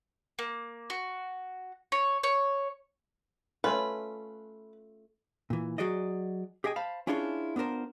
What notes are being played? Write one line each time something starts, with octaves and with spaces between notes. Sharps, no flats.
A#3
F#4
C#5
C#5
A3 C#4 F4 B4
A#2 E3
F#3 F#4 G#4 D5 D#5
G4 G#4 D#5 G5 G#5
C5 F5 A5 B5
C#4 D4 E4 F4 G#4 C#5
B3 D4 F4 A#4 C5